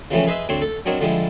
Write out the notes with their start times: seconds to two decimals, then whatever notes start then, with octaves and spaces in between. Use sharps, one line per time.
0.11 C#3 E3 F3 G3 A3 C#4
0.27 G#4 B4 C5 D#5 E5
0.49 D2 C4 D4 C#5 C6
0.62 A4
0.86 F#3 C4 D4 A#4 C#5 D#5
1.01 D3 F3 G3 G#3 E4